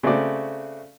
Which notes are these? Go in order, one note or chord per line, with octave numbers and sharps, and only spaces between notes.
C#3 A3 C4 F#4 D5